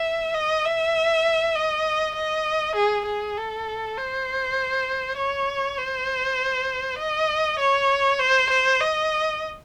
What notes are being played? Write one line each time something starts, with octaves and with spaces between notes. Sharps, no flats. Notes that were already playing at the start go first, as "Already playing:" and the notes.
Already playing: E5
D#5
E5
D#5
D#5
G#4
G#4
A4
C5
C#5
C5
D#5
C#5
C5
C5
D#5